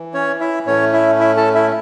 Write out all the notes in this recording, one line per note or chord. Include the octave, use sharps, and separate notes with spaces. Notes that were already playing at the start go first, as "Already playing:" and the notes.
Already playing: E3
C#4 C#5
E4 E5
A2 A3 C#4 C#5
E4 E5
E4 E5
A4 A5
E4 E5